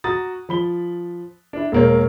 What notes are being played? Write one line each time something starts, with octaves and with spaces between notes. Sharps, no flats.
F#4 A#5 D#6 A6
F3 B5 G7
D4 E4
E1 A#3 C#5